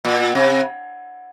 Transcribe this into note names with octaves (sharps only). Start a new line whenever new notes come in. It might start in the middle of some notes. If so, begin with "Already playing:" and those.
A#2
C3